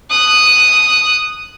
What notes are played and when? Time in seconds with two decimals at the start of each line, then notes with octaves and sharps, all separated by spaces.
0.11 D#6 F#6